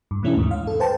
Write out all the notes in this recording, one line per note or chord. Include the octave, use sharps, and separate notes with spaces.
G2
B2 E3 A3 C#4 D4 E4
D#2 G#2
F5
A4
B4 C5 G5 A5